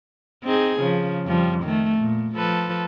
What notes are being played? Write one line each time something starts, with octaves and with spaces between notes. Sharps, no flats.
C4 D#4 G#4
C#3 F3
F2 F3 G3
D#3 A3
A#2
F3 A4 B4